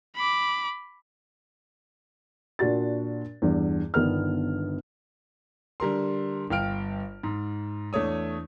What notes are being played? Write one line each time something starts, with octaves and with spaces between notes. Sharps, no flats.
B5 D6
A#2 D4 F#4 A6
E2 G2
G1 D#3 B3 D4 F6
D3 G3 A#4 C6
G1 F5 G5 F6 D7
G#2
E2 A3 D4 C#5 D#6